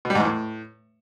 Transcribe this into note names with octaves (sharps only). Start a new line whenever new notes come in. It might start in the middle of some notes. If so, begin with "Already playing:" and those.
B2
G3
G#2
E2
A2